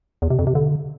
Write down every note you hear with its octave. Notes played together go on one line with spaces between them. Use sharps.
E2
C3
F2
C3
D3